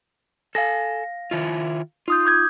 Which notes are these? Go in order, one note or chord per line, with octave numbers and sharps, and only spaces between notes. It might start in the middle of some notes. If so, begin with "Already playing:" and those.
A4 F5 G#5 A#6
D#3 E4 F4
D#4 F4 D#6 G6
D6 G6 G#6